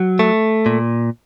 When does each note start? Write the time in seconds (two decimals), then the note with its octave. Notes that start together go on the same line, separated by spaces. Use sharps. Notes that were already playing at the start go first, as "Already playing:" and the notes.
Already playing: F#3
0.19 A3
0.66 A#2